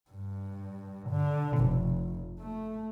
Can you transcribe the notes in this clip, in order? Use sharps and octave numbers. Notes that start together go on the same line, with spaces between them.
G2
D3
F1
A3